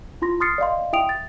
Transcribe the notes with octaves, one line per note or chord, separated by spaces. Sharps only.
E4 F4 C6 A#6
C6 D#6 F6 A6 C7 C#7
D5 D#5 F5 C6
E4 E5 G5 D#6 D7 F7
A6